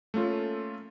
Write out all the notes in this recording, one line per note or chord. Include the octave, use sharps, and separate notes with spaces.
A3 A#3 C#4 F4 A4